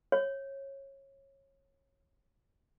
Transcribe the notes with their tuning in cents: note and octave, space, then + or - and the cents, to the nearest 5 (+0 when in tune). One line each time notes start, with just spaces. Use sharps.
C#5 -20